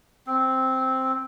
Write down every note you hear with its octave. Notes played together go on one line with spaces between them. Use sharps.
C4